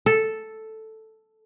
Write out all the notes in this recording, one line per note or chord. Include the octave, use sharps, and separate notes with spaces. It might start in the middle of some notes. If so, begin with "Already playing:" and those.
A4